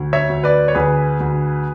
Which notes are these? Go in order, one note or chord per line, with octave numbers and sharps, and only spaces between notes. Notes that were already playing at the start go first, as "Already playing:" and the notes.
Already playing: D2
C#5 E5
D2
B4 D5
C#5
D2 G#4 B4
D2